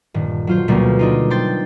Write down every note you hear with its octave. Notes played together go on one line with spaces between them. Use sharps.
D#1 G2
F#3 F4 C5
D2 B2 D3 F#3 G3 A#3
D4 D#4 F4
C5 G5 C6 A6